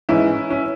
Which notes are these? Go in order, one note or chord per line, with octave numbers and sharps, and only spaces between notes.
G#2 E3 C#4 E4
C#4